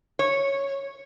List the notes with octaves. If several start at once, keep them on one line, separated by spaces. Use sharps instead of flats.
C#5